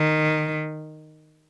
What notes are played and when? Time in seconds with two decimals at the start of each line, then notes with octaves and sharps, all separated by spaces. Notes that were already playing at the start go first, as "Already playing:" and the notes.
Already playing: D#3